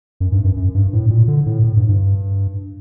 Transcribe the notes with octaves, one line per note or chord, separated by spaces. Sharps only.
F#2
G2
F#2
F#2
G2
A2
A#2
D3
A2
A2
G2
G2